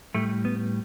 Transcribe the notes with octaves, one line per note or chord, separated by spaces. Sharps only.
A2 G3 A3
B3